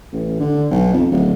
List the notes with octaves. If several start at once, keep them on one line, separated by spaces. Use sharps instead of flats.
A1
D3
B1
F2
D1